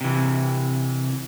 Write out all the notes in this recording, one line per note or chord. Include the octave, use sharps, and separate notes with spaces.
C3 E3